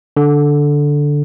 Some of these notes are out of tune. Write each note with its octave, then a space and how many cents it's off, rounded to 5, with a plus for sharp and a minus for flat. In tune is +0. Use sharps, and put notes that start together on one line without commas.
D3 -5